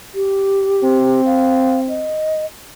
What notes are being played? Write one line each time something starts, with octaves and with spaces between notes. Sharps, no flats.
G4
C4
F5
D#5